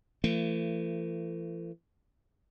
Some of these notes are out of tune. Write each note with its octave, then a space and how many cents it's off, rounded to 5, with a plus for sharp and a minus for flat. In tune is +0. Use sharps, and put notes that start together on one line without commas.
E3 +45 A3 +35